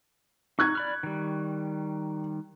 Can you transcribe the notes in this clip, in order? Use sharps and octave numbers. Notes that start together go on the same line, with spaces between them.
D#4 C#6 F#6 G#6
D5 B5 F6
D#3 G3